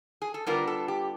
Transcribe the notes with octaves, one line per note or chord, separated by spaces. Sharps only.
G#4
A4
D3 G3 B3 D4 F4 A#4
A4
G4